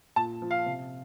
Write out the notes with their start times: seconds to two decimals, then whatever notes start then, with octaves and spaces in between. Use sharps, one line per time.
0.16 A#2 A5
0.42 F3
0.51 F5
0.66 C3